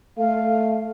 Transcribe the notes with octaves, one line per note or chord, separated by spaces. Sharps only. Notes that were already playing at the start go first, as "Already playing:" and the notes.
A3 F5